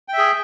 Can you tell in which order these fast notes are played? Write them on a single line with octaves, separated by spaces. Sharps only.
G5 E5 G#4